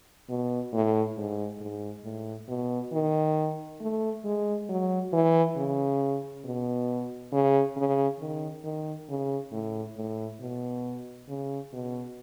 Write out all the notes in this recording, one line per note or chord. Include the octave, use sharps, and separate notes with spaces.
B2
A2
G#2
G#2
A2
B2
D#3
A3
G#3
F#3
E3
C#3
B2
C#3
C#3
D#3
D#3
C#3
A2
A2
B2
C#3
B2